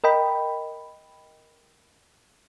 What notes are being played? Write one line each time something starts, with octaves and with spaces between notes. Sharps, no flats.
A#4 D#5 G5 B5